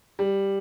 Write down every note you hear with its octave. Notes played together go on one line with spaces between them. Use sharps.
G3